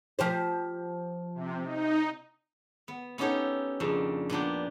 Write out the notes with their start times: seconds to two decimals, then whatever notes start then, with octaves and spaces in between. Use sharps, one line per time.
0.19 F3 G4 C5
1.35 C3
1.64 D#4
2.88 B3
3.18 B3 C#4 D#4 G4 A4 C#5
3.80 F2 A#2 C#3 D4
4.30 A#2 B3 D4 G4